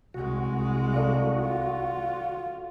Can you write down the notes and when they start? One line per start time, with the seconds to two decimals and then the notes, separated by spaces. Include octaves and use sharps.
0.14 C2 G#3 F#4
0.94 E4 A4 D5 F5
1.41 F4